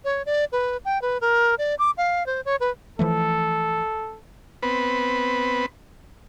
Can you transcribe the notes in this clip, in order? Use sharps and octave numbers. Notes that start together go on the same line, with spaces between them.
C#5
D5
B4
G5
B4
A#4
D5
D6
F5
C5
C#5
B4
E3 F3 A3 A4
B3 C4 B4